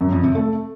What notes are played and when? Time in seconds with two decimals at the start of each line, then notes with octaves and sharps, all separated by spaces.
0.01 F#2
0.12 F2
0.24 C3
0.35 A3